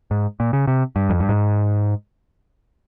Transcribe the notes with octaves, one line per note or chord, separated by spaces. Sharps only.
G#2
A#2
C#3
C3
G2
F2
G2
G#2